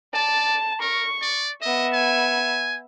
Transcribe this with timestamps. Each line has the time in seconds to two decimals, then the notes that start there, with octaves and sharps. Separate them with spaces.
0.14 D5 A5
0.81 A#4 C#6
1.22 D5
1.62 B3 D#5 E5
1.94 G#5